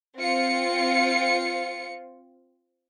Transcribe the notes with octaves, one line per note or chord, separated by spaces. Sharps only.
C4 F4 C#7